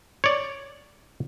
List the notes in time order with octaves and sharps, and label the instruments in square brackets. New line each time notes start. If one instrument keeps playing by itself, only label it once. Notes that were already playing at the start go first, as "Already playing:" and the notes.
[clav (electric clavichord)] C#5 D5